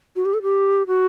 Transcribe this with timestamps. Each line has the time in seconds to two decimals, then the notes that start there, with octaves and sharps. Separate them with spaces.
0.16 F#4
0.25 G4
0.34 A4
0.42 G4
0.87 F#4